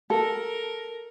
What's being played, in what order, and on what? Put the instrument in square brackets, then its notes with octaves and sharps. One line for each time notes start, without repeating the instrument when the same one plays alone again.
[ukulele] A4 [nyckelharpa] A#4